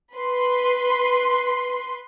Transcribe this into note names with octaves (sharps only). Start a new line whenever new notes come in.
B4 C6